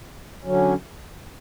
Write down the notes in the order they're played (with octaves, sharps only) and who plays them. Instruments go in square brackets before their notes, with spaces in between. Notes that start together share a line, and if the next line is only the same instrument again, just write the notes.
[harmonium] D3 F#3 C#4